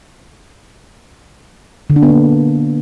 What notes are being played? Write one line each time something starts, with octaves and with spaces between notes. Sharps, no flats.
D3
D4
B3
A#3